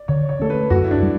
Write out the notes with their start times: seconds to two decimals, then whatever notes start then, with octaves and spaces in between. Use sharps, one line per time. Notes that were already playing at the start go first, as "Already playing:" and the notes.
Already playing: D5
0.08 D3 C#5
0.29 C#5
0.40 A3 C#4 A4
0.50 B4
0.70 F#2 F#4
0.84 E4
0.91 D4
1.01 G3 D4